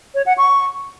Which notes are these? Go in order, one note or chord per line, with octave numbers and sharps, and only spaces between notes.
C#5
F#5
C#6